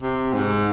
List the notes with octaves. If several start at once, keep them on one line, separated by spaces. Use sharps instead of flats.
C3
G#2